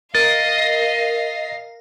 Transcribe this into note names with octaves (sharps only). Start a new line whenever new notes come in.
A#4 D#5 F5 A6 C7